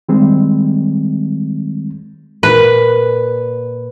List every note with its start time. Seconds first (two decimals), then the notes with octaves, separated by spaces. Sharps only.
0.09 D#3 G3 G#3 C4
2.43 A#2 B4